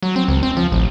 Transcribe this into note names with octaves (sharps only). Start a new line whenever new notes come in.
F#3
C4
C#2
C4
F3
A1